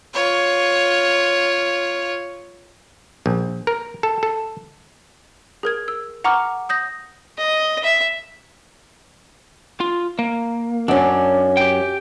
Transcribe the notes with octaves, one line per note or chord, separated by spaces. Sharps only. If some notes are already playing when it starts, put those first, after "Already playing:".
F4 C#5
A#1
A#4
A4
A4
G#4 A#4 G#6
E6
F#5 A#5 C#6 D6 F6
D#6 G6 A#6
D#5
E5
F4
A#3
F#2 C#4 D4
G4 G5